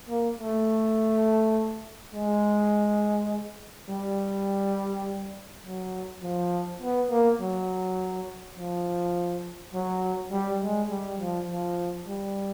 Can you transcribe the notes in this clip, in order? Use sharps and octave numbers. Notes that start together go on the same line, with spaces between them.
A#3
A3
G#3
G3
F#3
F3
B3
A#3
F#3
F3
F#3
G3
G#3
G3
F3
F3
G3